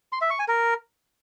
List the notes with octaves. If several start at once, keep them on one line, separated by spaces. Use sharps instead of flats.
C6
E5
C#6
G#5
A#4